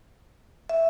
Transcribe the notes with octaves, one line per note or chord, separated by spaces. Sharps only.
E5